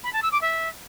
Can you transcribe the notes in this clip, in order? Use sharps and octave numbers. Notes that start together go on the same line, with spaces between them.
B5
A5
E6
D6
E5